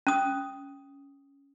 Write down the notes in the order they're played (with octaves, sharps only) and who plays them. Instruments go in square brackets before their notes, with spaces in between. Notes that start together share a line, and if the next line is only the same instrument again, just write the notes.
[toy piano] C#4 D#6